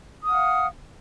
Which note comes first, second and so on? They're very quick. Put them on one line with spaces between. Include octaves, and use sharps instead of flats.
D#6 F#5 F6 F5